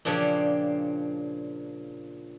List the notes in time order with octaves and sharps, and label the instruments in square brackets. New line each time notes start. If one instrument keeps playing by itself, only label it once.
[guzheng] A#2 C#3 F3 D4 G4 C#5